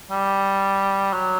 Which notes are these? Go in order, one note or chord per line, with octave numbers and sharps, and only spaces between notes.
G3
F#3